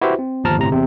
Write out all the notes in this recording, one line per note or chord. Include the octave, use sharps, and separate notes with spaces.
E4 F#4 G4 B4 C5 E5
C4
G1 D#2 F3 A5 A#5 F6
G1 A2 C3 A#5
E2 C3 C4